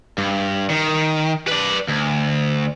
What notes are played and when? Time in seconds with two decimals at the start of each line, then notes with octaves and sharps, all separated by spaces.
0.18 G2
0.70 D#3
1.48 B4 D5
1.88 D2